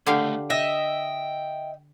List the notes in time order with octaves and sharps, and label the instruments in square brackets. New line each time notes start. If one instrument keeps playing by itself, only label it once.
[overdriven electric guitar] C#2 A3 [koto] D3 G4 F5
[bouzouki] D#5 E5 [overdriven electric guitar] G5